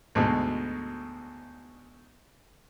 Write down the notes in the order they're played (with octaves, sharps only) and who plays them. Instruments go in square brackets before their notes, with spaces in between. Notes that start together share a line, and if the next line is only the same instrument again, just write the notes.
[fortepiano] D2 G#2 B2